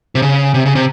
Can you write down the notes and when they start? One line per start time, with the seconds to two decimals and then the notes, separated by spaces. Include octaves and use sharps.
0.15 C3
0.22 C#3
0.54 C3
0.65 C#3
0.75 C3